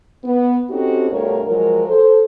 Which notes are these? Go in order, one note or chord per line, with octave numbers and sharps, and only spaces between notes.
B3
C4 C#4 D#4 F#4 G4 A4
D2 G2 B2 A#4 C#5
F3 F#3 G#3 A#4
A4 C5